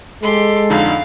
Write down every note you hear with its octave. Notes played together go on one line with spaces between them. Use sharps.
G#3 G4 A4 C6
F2 D3 D#4 F5